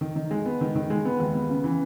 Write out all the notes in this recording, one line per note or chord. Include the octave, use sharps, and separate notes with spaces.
D#3
D#3
G#3
B3
D#3
D#3
G#3
B3
D#2
B3
C#3
E3